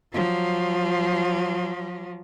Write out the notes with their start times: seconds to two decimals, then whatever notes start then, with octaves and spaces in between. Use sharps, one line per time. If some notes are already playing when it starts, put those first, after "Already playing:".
0.13 F3 F#3